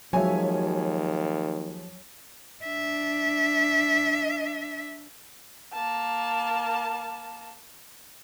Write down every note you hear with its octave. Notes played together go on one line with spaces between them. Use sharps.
D#2 F3 F#3 G#3 F#4 C#5 E5 G#5
D4 E5
A#3 A5